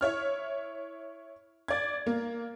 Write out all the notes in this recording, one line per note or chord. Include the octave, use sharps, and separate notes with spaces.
E4 C#5 F6
D5 G#6
A#3